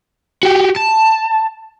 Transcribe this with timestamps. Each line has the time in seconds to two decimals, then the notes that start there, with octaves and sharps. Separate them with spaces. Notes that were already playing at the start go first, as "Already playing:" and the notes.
0.43 F#4 G4
0.76 A5